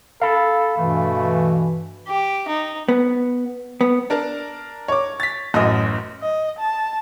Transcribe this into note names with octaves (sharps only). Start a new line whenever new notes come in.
A4 F5 B5
G2 B2 E3 A3
G4
D#4
B3
B3
D4 A#4 A5
C#5 D6
A6 B6
A1 F#2 D#5 D#6
D#5
A5